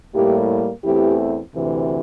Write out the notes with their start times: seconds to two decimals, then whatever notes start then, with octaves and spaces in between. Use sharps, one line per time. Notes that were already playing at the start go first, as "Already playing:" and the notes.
0.14 A2 G3 A#3 E4 G4
0.84 E2 E3 A3 C4 E4 G4
1.54 D2 C3 E3